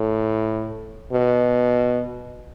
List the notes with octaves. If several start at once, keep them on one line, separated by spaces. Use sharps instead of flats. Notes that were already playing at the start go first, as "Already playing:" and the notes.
Already playing: A2
B2